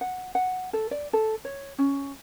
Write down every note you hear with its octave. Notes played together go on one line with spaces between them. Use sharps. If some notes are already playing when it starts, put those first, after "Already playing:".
F#5
F#5
A4
D5
A4
C#5
C#4